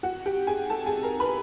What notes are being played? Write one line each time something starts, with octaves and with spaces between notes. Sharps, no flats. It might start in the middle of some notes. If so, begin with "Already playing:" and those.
F#4 F#5
G4 G5
G#4 G#5
A4 A5
G#4 G#5
A#4 A#5
B4 B5